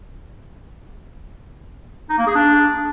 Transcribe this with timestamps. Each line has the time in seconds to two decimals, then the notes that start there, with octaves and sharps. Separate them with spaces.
2.10 D#4
2.18 A#3
2.27 G#4
2.36 D4